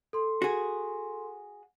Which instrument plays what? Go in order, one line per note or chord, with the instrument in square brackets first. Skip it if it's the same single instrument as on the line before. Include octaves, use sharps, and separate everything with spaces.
[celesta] A4 C6
[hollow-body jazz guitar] F#4 G#4